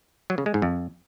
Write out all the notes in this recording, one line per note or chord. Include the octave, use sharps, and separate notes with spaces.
F#3
C#3
G#3
G#2
F2